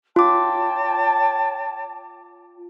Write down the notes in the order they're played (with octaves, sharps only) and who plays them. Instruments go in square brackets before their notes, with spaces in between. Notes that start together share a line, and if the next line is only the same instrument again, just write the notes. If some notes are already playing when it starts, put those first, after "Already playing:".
[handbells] F4 D6 [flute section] C#5 G5 A5